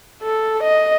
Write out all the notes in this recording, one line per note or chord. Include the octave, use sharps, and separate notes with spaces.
A4
D#5